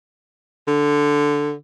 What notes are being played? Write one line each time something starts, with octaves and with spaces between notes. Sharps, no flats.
D3